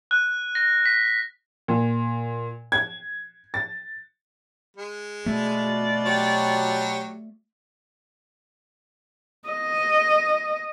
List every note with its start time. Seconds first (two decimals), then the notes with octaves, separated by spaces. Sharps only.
0.11 F#6
0.55 A#6
0.86 B6
1.68 A#2
2.72 G#6
3.54 A6
4.77 G#3
5.26 B2 A3 F4 F#4 D5
6.06 F#3 G4 C#5
9.49 D#5